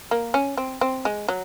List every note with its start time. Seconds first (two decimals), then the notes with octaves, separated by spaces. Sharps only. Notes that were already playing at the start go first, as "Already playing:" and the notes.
0.11 A#3
0.34 C#4
0.57 C4
0.81 C4
1.05 G#3
1.28 F#3